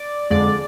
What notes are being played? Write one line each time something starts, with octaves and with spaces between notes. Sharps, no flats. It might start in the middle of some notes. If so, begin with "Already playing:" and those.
Already playing: D5
F2 D3 G#3 D5